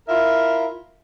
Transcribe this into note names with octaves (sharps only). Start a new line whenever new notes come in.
E4 F4 A#4 E5